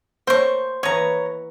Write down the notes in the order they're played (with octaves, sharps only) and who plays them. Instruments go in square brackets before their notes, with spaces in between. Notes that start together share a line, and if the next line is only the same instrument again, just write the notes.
[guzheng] A#3 C#5 A5 [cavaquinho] C5 C#6
[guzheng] E3 B3 D#5 [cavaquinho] C#5 A#5